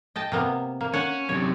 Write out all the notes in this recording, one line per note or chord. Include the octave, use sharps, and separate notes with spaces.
D#5 G5 A5
C3 A#3 B3
A#3
C#4 C#5 F#5 G#5
F#2 C3 C#5